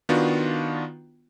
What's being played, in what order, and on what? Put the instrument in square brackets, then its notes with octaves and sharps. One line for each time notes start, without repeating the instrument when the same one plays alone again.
[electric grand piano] D#3 B3 D4 F4 F#4